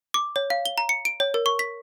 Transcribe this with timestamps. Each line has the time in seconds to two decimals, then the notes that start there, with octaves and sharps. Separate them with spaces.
0.14 D6
0.36 C#5
0.50 F5
0.65 G7
0.78 A#5
0.89 C#7
1.05 D7
1.20 C#5
1.34 A#4
1.46 C#6
1.59 B6